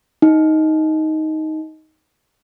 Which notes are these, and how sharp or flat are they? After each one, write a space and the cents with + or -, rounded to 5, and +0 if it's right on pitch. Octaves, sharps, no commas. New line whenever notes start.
D#4 +10